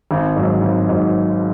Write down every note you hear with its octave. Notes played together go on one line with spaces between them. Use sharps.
G#1
G#2 F#3
G#1
G#2 F#3